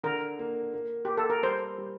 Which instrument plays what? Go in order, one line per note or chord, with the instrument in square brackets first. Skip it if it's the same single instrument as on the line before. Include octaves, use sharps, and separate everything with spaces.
[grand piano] D3 [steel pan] A#4
[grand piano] A#3
A#3
[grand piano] A#3 [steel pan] G4
[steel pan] A4
A#4
[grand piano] G3 [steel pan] C5
[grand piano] G3